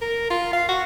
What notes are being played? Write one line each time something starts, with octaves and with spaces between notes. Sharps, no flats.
A#4
F4
F5
F#4